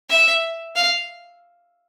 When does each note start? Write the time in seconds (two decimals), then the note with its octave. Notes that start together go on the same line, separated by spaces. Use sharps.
0.09 E5
0.76 F5